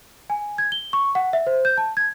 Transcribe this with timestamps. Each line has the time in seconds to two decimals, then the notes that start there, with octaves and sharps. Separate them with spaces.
0.30 G#5
0.58 G#6
0.72 G7
0.93 C#6
1.15 F#5
1.33 E5
1.47 C5
1.65 G6
1.78 A5
1.97 G#6